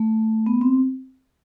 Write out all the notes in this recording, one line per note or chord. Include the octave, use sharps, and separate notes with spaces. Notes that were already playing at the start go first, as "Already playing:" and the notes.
Already playing: A3
B3
C4